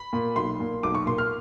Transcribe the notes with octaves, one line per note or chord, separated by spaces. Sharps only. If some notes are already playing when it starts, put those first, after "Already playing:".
Already playing: B5
A#2
B1 C6
A#2
B1 D6
C#6
A#2 C6
F6